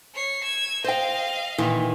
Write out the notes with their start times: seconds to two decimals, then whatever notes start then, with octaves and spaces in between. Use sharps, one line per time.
0.14 C#5 C7
0.43 E6 G#6
0.84 C5 D#5 F5 G5
1.58 A#2 D#3 E3